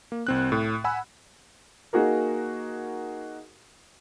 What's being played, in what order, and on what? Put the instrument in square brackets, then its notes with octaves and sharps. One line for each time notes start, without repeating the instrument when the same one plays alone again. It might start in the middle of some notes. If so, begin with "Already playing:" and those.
[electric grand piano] A#3
C2 C4 F#6
A2
F#5 G#5 B5 E6
[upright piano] A#3 D#4 F#4 G#4 A#4